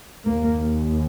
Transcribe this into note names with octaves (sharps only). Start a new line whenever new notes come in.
D#2 A#3